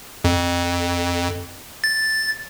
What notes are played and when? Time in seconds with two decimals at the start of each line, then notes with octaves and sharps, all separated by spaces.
0.24 F2
1.84 A6